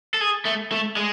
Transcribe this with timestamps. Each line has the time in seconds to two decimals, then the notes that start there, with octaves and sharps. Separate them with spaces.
0.14 A4
0.21 G#4
0.45 A3
0.72 A3
0.97 G#3